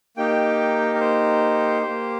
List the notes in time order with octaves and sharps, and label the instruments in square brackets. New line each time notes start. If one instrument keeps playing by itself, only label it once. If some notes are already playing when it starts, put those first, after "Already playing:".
[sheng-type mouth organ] A#3 D#4 G4 G5
A#4
C5
G4
A#3